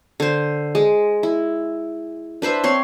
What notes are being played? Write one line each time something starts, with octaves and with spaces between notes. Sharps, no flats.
D3 C5
G#3
E4
D4 B4 C5 E5
C4 C#5 C6